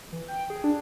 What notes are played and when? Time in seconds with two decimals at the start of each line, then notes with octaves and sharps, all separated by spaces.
0.12 E3
0.28 G5
0.50 G#4
0.64 D4